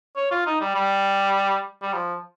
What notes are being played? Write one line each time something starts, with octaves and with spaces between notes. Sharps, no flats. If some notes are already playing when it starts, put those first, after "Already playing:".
C#5
F4
D#4
G3
G3
G3
F3